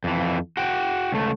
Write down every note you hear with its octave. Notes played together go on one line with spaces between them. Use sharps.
F2 E3
F#4 G5
C#2 A3